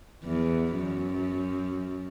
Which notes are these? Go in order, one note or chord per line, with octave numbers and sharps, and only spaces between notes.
E2
F#2